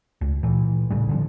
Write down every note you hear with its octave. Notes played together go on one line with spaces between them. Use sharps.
C#2
A#2 E3
A1 A2 C#3 G3
D3 E3 F3